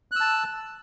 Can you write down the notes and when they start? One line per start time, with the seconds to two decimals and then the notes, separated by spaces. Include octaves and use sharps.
0.12 F#6
0.16 E6
0.20 A5